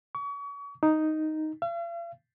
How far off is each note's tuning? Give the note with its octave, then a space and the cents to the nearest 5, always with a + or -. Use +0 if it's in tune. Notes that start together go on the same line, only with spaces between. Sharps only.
C#6 +35
D#4 +0
F5 -45